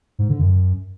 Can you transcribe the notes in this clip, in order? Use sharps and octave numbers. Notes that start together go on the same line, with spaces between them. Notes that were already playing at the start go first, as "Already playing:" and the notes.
G#2
D3
F#2